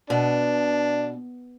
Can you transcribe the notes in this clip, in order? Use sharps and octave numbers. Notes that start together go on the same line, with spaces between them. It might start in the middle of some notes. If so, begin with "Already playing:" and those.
B2 D4